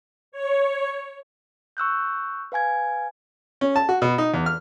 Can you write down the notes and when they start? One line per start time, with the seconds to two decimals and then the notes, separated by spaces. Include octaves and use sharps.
0.32 C#5
1.77 C#6 E6 F#6 G6
2.52 B4 F5 G#5 G#6
3.61 C#4
3.76 A5
3.89 F#4
4.02 B2
4.18 D#4
4.34 E2
4.46 F6